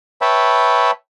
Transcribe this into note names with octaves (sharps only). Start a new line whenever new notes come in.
B4 C#5 E5 G5 A5 B5